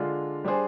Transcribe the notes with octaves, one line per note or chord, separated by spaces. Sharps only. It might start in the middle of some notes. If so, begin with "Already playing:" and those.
Already playing: D3 G#3 D4 F4
G3 D4 G#4 C5